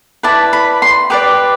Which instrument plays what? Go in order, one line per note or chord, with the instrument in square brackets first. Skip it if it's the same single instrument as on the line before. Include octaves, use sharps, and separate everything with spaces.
[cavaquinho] E4 B4 D5 A5
B5
C6
G4 B4 D5 D6